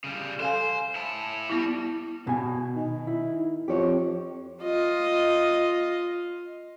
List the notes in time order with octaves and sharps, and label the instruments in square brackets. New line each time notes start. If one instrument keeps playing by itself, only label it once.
[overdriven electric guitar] C#3 G3
[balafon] A4 F5 G#5 [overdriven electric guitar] C5
[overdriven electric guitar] E4 A5
[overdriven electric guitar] G3 [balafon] B3 E4
[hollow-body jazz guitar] B2 G#5
[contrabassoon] D#3
[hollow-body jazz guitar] E4
[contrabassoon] F2 [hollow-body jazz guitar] G4 C#5
[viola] F4 D#5